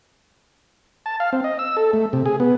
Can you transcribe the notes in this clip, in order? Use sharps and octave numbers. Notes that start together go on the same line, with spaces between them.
A5
F5
C4
D#5
E6
A4
A3
C3
G#4
B3